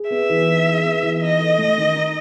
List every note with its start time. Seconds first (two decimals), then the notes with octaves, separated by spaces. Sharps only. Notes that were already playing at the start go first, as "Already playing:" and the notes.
Already playing: G#4
0.10 B3 E5
0.30 E3
0.48 D#4
0.67 G#4
0.84 B3
1.03 E3
1.22 D#4 D#5
1.40 A4
1.58 A3
1.78 D#3
1.96 D#4